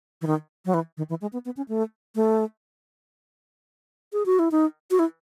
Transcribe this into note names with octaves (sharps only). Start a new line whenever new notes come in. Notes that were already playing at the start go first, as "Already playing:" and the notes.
E3
D#3
F#3
E3
D#3
E3
G#3
B3
B3
C#4
A3
A3
G#4
F#4
E4
D#4
F#4
E4